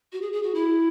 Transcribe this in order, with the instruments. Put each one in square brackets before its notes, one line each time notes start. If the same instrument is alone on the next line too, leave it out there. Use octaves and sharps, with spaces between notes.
[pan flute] F#4
G#4
G#4
F#4
E4